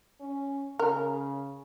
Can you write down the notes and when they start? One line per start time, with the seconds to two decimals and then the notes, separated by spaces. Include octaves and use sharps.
0.21 C#4
0.79 C#3 A#4